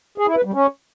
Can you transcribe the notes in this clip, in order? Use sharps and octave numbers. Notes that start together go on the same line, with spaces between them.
G#4
E4
B4
G3
C#4